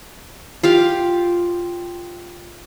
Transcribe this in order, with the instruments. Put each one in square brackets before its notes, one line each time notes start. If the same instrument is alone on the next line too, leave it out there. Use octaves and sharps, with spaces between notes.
[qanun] F4 G4 F5